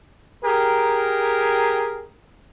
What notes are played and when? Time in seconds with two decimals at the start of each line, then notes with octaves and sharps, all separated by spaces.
0.44 G4 G#4 A#4